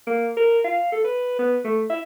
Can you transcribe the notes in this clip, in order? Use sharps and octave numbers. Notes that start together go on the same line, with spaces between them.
A#3
A#4
F5
A4
B4
B3
A3
E5